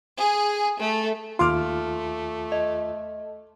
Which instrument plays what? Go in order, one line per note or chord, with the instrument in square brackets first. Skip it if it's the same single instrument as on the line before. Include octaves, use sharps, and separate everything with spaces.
[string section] G#4
A3
[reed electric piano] D#2 F4 [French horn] A3 [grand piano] C6 D6 F6
[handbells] D#5